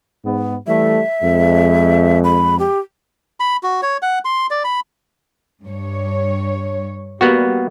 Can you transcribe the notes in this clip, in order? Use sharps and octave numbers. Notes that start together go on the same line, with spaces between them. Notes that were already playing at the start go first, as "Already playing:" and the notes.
G#2 B3
E3 G3 A3 E5
F2 G#3
B5
G4
B5
F#4
C#5
F#5
C6
D5
B5
G2 C#5
G3 A#3 B3 F#4